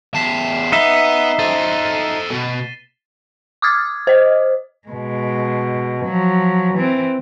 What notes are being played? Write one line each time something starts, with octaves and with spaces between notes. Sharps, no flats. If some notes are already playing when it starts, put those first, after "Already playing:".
E2 A5 B6 C7 E7
B3 D#4 E5 G7
A4 C5 A6 D#7
B2
D6 D#6 F6 G#6 A6
C5 D#5
B2 G#3
F3 F#3
E3 C4